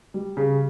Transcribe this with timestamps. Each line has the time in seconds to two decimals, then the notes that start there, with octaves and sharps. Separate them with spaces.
0.14 G3
0.37 C#3